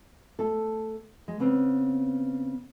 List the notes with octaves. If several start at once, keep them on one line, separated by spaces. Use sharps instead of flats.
A3 A4
G#3
C#3 B3 C4